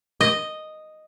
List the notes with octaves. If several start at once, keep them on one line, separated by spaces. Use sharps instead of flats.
D#5